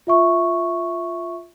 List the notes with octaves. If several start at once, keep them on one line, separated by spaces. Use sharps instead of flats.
F4 E5 C#6